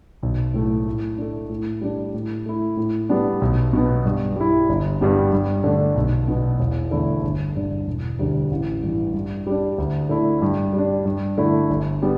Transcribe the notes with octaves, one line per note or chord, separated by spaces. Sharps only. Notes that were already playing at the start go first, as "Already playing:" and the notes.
B1
A2 A3
A2
A3 D4
A2
G3 D4
A2
A3 E4
A2
G3 B3 D4
B1
B2 B3
G2
G3 E4
G1
G2 G3 B3
G2
D3 A3 D4
B1
B2 B3
E1
E2 D3 A3 E4
G1
G2 D3
E1
D2 D3 G3 D4
A1
G2 E3
G2
G3 D4
D2
D3 A3 E4
G2
G3
D4
G2
D3 A3 E4
G1
G3 B3